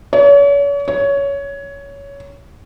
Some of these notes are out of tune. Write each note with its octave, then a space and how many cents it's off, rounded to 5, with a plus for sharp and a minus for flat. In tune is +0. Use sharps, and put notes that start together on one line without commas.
C#5 +40
C#5 +15